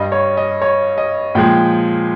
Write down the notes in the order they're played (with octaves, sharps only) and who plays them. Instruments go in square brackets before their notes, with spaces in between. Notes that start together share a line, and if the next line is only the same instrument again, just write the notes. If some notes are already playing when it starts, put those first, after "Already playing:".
Already playing: [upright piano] G2 G3 D#5
C#5
D#5
C#5
D#5
A#2 F3 G#3 G5